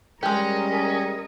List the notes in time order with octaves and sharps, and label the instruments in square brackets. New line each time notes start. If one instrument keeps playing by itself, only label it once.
[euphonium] G3 [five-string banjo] G#3 G4 [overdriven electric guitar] C#4 [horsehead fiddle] A#4 D#5